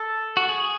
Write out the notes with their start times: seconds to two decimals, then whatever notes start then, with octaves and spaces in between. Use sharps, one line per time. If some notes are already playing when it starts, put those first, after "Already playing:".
Already playing: A4
0.37 F#4
0.49 G#4